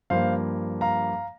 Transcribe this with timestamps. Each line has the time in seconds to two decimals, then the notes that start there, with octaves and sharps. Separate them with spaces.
0.10 G2 F3 A#3 C5 F5
0.81 F5 A#5